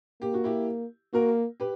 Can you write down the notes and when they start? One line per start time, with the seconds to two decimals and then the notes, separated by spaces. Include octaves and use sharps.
0.22 A#3 G4
0.34 F#4
0.44 E4 G4
1.13 A#3 F#4 A#4
1.60 G4 B4